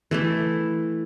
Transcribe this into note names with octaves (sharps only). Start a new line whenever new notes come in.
E3 A3 E4